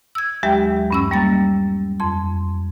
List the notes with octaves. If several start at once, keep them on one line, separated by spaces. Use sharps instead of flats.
E6 G#6
D#2 F#3 G#3 G4 E5 G5
G2 C#4 E6
G3 A#3 A6
F2 C6